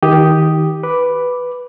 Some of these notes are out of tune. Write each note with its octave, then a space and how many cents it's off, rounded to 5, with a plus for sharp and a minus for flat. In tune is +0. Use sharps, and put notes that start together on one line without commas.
D#3 +25 G4 +0 D#6 +0
B4 +0 D6 +0